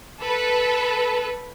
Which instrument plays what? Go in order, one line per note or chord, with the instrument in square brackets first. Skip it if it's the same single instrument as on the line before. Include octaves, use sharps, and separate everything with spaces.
[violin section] A4 B4